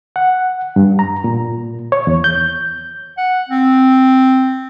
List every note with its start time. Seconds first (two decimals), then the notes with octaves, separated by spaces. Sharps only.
0.16 F#5
0.76 G2
0.99 A#5
1.24 A#2
1.92 C#5
2.07 E2
2.24 G6
3.18 F#5
3.49 C4